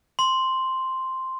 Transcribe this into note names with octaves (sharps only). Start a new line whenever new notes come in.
C6